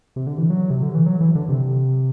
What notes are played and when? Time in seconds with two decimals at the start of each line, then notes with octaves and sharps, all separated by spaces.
0.16 C3
0.27 D3
0.38 E3
0.50 F#3
0.70 C3
0.82 D3
0.95 E3
1.06 F#3
1.21 E3
1.35 D3
1.49 C3